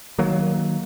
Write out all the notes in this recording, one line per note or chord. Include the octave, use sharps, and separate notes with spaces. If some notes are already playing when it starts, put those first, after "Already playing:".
D#3 F#3 A#3